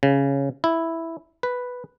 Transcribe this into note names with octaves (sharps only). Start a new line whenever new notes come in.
C#3
E4
B4